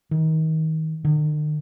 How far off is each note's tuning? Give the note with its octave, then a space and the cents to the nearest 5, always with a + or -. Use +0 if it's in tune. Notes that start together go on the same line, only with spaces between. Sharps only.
D#3 +30
D#3 -45